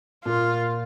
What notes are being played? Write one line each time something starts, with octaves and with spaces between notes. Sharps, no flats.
A#2 A#3 F4